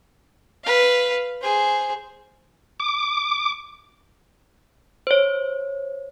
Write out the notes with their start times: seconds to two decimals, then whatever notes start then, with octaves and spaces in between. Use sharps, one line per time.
0.65 B4 F5
1.41 G#4 C5
2.80 D6
5.07 C5 C#5